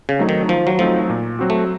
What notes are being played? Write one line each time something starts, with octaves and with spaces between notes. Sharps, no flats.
C#3
F#3 A3 C4 D#4
D#3
D#3 F3
F#3
F3 F#3 A3 C4 D#4
A#2
F#3 C4 F#4
A3